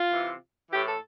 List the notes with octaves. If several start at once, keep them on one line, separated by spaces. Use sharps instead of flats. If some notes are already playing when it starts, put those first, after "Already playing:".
Already playing: F4
C3 E3
A2 E3 G4
A4